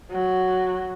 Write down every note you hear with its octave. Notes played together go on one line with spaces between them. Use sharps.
F#3